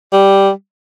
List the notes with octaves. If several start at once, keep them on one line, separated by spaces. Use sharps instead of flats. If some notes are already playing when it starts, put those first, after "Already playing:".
G3